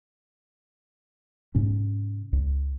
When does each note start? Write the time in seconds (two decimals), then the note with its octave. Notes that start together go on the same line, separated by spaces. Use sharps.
1.55 G#2 C3 C#4
2.33 C#2